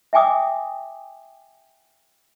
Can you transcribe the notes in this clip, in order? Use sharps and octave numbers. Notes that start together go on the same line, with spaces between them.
E5 G5 G#5 D6 D#6